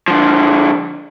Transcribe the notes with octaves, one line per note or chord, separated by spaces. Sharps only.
D3 F3